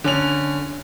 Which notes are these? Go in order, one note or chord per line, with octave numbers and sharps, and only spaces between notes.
D3 C#4 F7